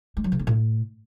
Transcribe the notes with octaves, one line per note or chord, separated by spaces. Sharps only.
G#3
F#3
C#3
B3
A2